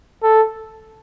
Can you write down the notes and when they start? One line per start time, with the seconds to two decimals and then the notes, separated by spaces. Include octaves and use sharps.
0.23 A4